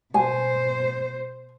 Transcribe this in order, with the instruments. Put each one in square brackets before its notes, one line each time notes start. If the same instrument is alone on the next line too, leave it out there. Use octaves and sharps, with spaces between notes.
[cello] B2 C5 [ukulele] G#5